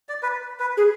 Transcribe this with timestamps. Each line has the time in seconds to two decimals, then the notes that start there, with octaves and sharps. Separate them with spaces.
0.09 D5
0.23 B4
0.60 B4
0.77 G#4